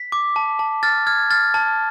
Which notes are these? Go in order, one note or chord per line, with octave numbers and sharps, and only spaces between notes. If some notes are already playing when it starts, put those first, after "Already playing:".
Already playing: B6
D6
A5
A5
F6 A6
F6 G#6
F6 A6
A5